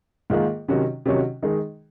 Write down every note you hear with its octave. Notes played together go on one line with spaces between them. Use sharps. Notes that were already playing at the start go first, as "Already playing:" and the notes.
G#2 D#3 A#3 F4 G#4
C3 D#3 F#3 C#4 F#4
C3 D#3 F#3 C#4 F#4
D#3 G#3 D#4 G#4